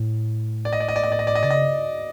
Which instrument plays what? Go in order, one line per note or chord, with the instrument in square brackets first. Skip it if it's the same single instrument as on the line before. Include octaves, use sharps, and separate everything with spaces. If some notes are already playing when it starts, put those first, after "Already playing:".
Already playing: [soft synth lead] A2
[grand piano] D5
D#5
D5
D#5
D5
D#5
D5
D#5
D5
D#5
[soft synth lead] C#3 [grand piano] D5
[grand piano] D#5